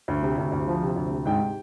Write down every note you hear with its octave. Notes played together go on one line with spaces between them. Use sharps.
D2
C3
D2
D2
F3
C3
D2
C3
G#2 G5